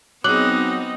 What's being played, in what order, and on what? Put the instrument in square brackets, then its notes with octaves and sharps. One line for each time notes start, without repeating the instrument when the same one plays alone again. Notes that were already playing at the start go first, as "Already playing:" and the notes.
[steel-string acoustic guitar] F#3 G#4 [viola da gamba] B3 C4 D#4 [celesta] D6 F#6 F#7